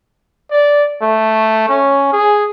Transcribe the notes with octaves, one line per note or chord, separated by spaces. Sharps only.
D5
A3
C#4
G#4